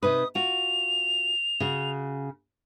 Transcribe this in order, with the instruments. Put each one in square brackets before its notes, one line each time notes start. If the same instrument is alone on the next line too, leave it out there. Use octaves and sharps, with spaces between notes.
[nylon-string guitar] C3 D#4 B4 [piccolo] D#6
[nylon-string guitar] F4 F#4 [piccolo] F7
[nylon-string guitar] C#3 F#4